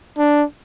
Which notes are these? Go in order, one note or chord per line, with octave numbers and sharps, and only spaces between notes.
D4